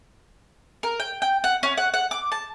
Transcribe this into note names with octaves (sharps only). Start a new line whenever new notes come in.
A#4
G5
G5
F#5
C#4
F#5
F#5
D6
A5